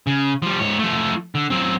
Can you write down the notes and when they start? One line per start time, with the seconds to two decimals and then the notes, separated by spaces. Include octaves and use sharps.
0.07 C#3
0.42 F3 G3
0.59 G#2 C#5
0.79 F3 A3
1.35 D3
1.50 F#3 C4